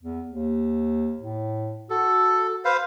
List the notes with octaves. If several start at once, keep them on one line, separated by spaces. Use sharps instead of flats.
E2
D#2
A2
F#4 A4
B4 C5 F5